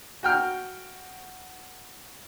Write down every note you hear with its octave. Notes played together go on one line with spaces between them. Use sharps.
F#4 G5 F6